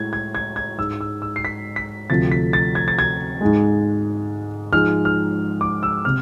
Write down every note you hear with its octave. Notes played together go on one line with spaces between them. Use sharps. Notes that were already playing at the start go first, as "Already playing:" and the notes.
Already playing: A2 G#3 G#6
G#6
G#6
G#6
G#2 G#3 E6
E6
E6
C7
B6
B6
D2 C3 F3 A3 A6
B6
A6
G#6
A6
G#6
G#2 G#3
G#2 F3 G#3 F6
F6
D6
E6
C3 F6